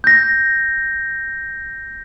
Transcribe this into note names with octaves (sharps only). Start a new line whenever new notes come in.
G6 A#6